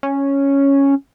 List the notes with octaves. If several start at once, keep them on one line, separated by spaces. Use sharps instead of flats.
C#4